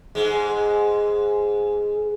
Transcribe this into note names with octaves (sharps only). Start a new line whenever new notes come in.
G#2 G#3